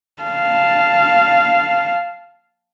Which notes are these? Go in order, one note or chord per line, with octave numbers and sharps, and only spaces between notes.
F5 A5